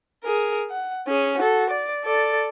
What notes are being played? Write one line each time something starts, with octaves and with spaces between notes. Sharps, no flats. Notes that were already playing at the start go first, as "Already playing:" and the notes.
G#4 A#4
F#5
C#4 G#4
F#4 A4
D5
A4 D5